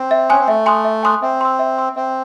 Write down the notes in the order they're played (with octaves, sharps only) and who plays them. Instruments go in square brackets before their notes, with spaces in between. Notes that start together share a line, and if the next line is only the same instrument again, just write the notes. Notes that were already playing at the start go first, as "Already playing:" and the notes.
Already playing: [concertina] C4
[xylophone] E5
[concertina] C#4 [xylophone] G#5 C6 D#6 F#6
[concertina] C4
[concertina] A3 [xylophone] E5
[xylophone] G#5 C6 D#6 F#6
E5
G#5 C6 D#6 F#6
[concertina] C4 [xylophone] E5
[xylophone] C6 E6
E5
C6 E6
[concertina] C4 [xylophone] E5